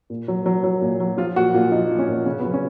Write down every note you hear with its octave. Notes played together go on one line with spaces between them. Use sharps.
A#2
F#3
F#3
F#3
A#2
F#3
F3 F4
A#2 F#4
A#2 F4
F3 D#4
F3
C#4
A#2
C#3 C#4
F#3 B3
C#4